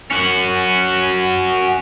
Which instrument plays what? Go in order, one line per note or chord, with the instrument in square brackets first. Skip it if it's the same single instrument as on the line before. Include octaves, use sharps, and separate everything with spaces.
[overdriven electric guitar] C#4 F#4